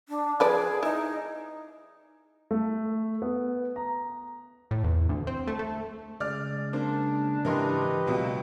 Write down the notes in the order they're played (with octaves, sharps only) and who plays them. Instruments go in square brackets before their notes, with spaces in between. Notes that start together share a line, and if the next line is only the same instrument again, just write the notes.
[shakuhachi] D4
[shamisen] F3 B4 D5 [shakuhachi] G#4
[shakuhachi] D#4 [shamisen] E4
[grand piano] A3
B3
A#5
[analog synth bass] A2
E2
D2
C4
A3
A3
[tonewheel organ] C#3 G#3 [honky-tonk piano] D5 F6
[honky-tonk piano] A#3 C5 [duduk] D4
[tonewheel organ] G#2 C#3 [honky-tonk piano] E3 A#4 C6 [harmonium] G4 B4 D#5
[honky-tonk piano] C#2 B2 F#3 [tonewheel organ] D4 F4 E5